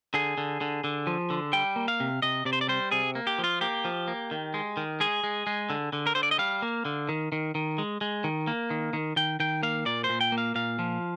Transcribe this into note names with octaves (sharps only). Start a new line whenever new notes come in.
D3 G#4
D3
D3
D3
F3
D3
G3 G5
A#3
F5
C3
C3 D#5
C3 D5
C5
D5
G3 C5
C3 G#4
A#3
G4
F3
F4
A#3 G4
F3
A#3
D#3
G#3
D#3
G#3 G#4
G#3
G#3
D3
D3
A#4
D3 C5
D5
D#5
G3 F5
A#3
D3
D#3
D#3
D#3
G#3
G#3
D#3
A#3
D#3
D#3
D#3 G5
D#3 G5
A#3 F5
A#2 D5
C5
A#2
G5
A#3
F5
A#2 F5
F3